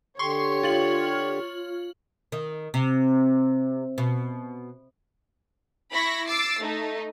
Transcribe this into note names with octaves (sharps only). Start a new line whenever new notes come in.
D3 G4 C#5 C6 C#6
F4 F#7
D#3
C3
B2
E4 B5 C#6 A#6 B6
D6 E6 A6 C7
A3 D#4